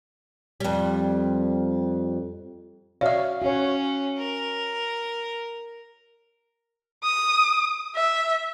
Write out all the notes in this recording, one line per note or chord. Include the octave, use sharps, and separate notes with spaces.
F2 G3
F#4 C#5 D5 E5 F5
C#4 F#4 C#5
A#4
D#6
E5